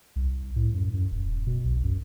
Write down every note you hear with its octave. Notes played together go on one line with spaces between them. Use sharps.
C2
A2
F#2
F#2
D#1
B2
B1
F#2